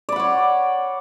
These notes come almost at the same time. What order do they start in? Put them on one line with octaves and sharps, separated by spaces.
D5 B5 F#5 C#5